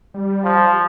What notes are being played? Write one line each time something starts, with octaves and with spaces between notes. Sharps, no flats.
G3
F3